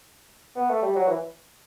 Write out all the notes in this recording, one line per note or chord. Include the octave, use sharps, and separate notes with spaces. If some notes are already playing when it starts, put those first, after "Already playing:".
B3
A3
G3
F#3
E3